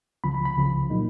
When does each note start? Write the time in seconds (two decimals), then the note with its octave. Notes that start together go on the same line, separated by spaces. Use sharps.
0.24 C#2 C#3 F3 B5
0.34 B5
0.45 B5
0.56 C#2 C#3 F3
0.90 A#2 F#3 A#3 D#4